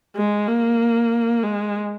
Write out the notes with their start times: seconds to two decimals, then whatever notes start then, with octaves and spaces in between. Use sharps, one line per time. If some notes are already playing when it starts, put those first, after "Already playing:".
0.16 G#3
0.47 A#3
1.43 G#3